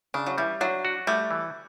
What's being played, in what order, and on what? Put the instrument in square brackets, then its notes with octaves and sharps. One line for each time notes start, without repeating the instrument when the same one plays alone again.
[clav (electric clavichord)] C#3 [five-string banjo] D4
[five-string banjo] F#3
[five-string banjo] E3 [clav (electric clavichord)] G3
[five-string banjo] F#3 [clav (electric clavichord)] D4
[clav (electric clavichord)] F#4
[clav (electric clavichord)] G3 [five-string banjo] A3
[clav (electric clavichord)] E3